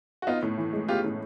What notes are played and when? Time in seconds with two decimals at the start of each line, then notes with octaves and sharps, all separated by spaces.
0.22 F#4
0.27 B3 D#4 F4
0.42 A2
0.58 E3
0.73 G#3
0.88 B3 F4 G4
1.04 A2